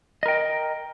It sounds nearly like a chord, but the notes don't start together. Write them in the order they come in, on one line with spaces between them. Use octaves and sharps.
D#5 A#4 G5